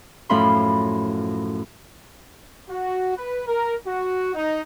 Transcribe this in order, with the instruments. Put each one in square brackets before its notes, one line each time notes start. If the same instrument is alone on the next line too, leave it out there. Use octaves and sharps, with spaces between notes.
[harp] F#2 A2 F3 F5 B5 C6
[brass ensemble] F#4
B4
A#4
F#4
D#4